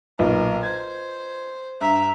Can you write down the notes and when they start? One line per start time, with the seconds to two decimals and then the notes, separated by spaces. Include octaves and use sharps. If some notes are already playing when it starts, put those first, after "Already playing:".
0.19 B1 A#2 F4 A#4 B4 D#5
0.63 C5 G#6
1.81 G2 E5 A#5